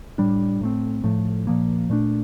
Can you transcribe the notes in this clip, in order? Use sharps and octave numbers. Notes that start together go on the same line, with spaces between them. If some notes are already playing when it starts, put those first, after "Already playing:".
A2 G3 D4
A2 A3 C4
A2 F3 A3
A#2 F3 A#3
A#2 A3 D4